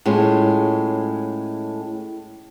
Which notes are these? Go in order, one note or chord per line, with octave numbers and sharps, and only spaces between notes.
A2 G#3 C#4 F4